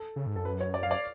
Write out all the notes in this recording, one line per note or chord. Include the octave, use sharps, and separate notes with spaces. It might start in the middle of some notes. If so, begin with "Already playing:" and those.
Already playing: A4
C#3
G#2
F#2 A4
B4
C#5
D5
F5
D5